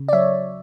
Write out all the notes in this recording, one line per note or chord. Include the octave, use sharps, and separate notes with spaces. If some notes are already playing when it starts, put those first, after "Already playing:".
Already playing: C#3
D5
F#3 C#5 E5